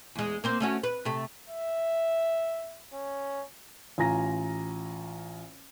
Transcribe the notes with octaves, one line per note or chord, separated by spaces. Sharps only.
E2 G#3
A#3 C4 C5
A3 C#4 F#4
B4
C3 A3
E5
C#4
A1 F4 G#5 A#5 A#6